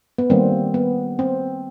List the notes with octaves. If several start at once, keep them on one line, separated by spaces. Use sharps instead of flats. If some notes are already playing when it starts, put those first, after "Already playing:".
B3
D#3 G3 A#3 C4
B3
C4